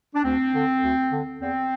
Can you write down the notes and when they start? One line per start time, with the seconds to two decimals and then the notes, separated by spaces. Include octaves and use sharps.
0.14 D4
0.24 D2 C4
0.54 D3
0.83 D2
1.11 D3
1.40 E2 C4